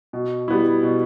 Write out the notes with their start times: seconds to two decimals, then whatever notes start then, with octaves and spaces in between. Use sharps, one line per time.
0.13 B2
0.48 G3 B3 E4
0.83 B2